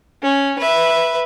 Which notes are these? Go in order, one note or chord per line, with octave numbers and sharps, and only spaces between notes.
C#4
B4 E5